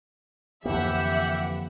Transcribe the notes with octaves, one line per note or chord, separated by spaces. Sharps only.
F2 D3 E3 A#3 G4 E5 F#5